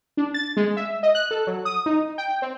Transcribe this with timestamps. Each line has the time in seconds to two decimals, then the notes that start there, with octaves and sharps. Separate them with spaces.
0.17 D4
0.34 A6
0.57 G#3
0.77 E5
1.03 D#5
1.15 F#6
1.31 A4
1.47 F#3
1.65 D#6
1.86 D#4
2.18 G5
2.42 C4